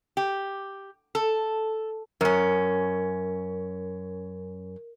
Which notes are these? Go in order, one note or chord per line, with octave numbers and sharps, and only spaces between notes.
G4
A4
F#2 C#4 A#4